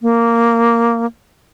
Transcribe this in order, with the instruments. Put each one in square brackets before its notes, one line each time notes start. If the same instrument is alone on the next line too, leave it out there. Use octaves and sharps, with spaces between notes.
[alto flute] A#3